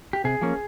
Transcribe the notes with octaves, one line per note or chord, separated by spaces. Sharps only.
G4
C3 G#4
F3 A#3 C#4